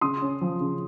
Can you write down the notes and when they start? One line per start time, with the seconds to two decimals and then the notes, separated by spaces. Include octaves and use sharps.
0.01 C#3 C6 D#6
0.22 C#4
0.41 F3
0.60 C#3